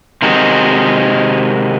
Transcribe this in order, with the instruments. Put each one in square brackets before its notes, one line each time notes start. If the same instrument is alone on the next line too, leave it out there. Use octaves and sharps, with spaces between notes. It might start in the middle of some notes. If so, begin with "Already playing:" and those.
[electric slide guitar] C3 D#3 G#3 D#4 F#4